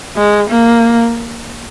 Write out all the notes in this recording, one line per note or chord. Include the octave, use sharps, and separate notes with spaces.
G#3
A#3